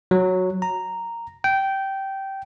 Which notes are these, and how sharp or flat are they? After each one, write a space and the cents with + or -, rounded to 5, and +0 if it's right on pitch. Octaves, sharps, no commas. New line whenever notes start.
F#3 -5
A#5 -5
G5 -15